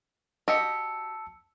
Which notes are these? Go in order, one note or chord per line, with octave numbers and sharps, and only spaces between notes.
F#4 G4 D#5 A5 E6 C#7